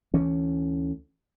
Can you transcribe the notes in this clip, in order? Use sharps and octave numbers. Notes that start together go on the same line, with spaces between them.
D2 E3 C#4